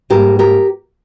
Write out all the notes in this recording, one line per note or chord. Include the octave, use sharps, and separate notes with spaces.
G#2 G3 A#3 G4 A#4
G4 A#4